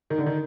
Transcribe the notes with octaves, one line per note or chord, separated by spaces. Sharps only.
D#3
D3
D#3